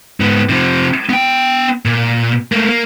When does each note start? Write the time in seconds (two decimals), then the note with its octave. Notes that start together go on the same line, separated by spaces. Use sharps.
0.20 G#2 B3
0.49 C3 F3
1.09 B3 G5
1.85 A#2
2.52 A3 A#3
2.69 A#3